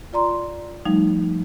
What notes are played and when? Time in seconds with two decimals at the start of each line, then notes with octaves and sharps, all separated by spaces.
0.13 F4 D5 A#5 C6
0.85 F3 G3 A3 D#4